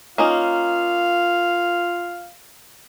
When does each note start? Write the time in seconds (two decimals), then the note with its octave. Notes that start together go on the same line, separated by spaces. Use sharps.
0.18 A#3 C#4 D#4 F4 F5